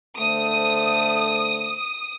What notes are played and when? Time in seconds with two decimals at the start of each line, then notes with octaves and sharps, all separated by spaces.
0.19 D3 A3 C5 D#6